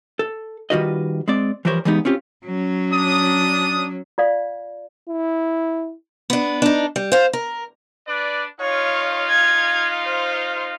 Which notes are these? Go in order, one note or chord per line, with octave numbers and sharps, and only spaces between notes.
A4
D#3 G3 F4 F#4 B4 D#5
G#3 C4 D5
E3 F3 G3 A#4 C5 C#5
E3 G3 G#3 B3 D#4
C4 C#4 F4 G4
F#3 C#4
D4 D#6
F4 D5 F5
E4
B3 D4
D4 D#4
G3
C5 F5
A#4
D4 B4 D5
D#4 F4 C#5 F5
G#6
C5